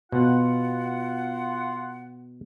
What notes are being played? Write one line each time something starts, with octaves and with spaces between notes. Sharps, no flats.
B2 F4 F#5